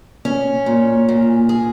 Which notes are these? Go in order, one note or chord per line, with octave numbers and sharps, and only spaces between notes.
C#4
A#2
A#2
G#4